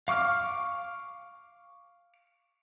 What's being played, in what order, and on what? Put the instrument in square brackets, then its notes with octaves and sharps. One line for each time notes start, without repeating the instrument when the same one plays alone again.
[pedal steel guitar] F5 C#6 D6 F6